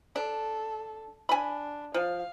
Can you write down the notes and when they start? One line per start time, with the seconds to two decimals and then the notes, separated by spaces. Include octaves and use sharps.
0.16 D4 A4
1.29 D4 G#5 B5
1.94 F3 F5